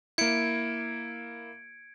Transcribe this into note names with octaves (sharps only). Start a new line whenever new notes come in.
A#3 E4 G#6 C#7 D7